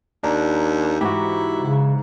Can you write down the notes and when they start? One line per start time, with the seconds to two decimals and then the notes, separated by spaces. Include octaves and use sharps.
0.23 D#2 D4 A#5
1.01 G#2 E3 E4 F#4 G4
1.60 C#3